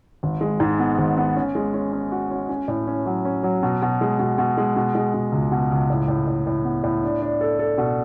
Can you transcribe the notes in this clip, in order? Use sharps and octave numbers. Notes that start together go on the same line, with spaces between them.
G#1
G#3
G#2
B3
G#1
B3
C#4
G#3
C#4
C#4
F#4
C#4
C#4
A2
C#4
F#3
C#4
F#3
B2
B2
G#3
B2
B2
G#3
B2
G#3
B2
C#2
B2
C#2
A2
A2
A2
A2
B3
A2
D4
D4
A4
A4
B2